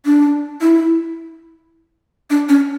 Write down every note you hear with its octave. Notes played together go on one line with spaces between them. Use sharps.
D4
E4
D4
C#4